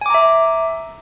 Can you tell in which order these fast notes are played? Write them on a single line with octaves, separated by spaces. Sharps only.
G#5 D6 A#5 E5